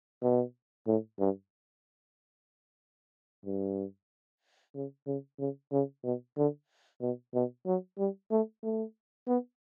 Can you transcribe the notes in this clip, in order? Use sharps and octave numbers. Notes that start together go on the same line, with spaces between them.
B2
A2
G2
G2
C#3
C#3
C#3
C#3
B2
D3
B2
B2
F#3
G3
A3
A3
B3